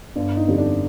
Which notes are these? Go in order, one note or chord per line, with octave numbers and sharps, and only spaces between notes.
G1 D4
D#4
F2 D3 G3
D4